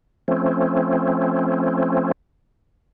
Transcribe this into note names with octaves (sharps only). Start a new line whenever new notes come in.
F3 A3 C4 C#4